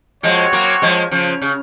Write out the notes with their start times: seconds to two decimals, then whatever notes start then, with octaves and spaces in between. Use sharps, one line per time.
0.23 F3 G#3 C4 F#4 C#5
0.53 F#3 A#3
0.82 F3 G#3
1.11 C#3 F3
1.42 C#3